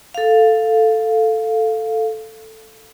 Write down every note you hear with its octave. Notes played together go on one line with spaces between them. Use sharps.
A4 F5